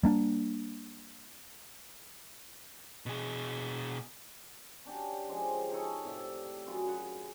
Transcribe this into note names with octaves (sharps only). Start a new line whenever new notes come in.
G3 A#3 D4
B2 G#4
C#4 D4 G4 F#5
C#3 F3 G#3 G4
D#4 G#4 A4 C#5
A2 C3 D5 E5
F#2 F4 G#4
F#2 G#4 F#5